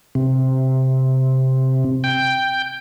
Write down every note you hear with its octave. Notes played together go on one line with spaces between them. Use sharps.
C3
G5